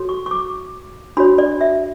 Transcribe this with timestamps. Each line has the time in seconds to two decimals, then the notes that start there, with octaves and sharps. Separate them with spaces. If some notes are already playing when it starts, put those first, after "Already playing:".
Already playing: F#4 A4 C#5
0.09 C#6
0.26 C#6
0.31 D6
1.17 D4 F#4 C#5 B5
1.38 D5
1.61 E5